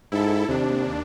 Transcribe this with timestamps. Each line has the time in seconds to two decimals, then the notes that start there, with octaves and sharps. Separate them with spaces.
0.12 G#2 E4 A4
0.48 D#2 C3 D4